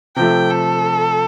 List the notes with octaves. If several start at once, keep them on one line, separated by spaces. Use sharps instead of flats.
C3 F3 A3 G5
A4